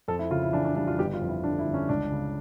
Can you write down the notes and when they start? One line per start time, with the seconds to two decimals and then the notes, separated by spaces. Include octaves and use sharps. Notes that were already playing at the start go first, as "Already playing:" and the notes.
0.08 F2 A4
0.19 E4
0.31 C#3 F4
0.43 E4
0.53 E3 D4
0.65 D4
0.75 G3 D4
0.87 F4
0.98 G1 G4
1.13 F4
1.21 F2
1.29 E4
1.44 D3 D4
1.59 E4
1.66 G1
1.74 C#4
1.89 C#2 D4
2.11 C#3